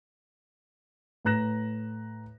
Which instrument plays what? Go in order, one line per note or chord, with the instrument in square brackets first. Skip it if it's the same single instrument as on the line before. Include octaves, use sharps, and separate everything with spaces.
[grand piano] A2 B4 A#5 F#6 A#6 E7